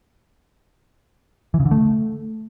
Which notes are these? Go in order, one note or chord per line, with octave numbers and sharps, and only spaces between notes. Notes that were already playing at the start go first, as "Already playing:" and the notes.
E3
C#3
D3
A3